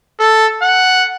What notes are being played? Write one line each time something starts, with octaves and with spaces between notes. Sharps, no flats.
A4
F#5